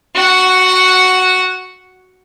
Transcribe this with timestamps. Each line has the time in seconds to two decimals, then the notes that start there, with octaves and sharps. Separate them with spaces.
0.15 F#4 F#5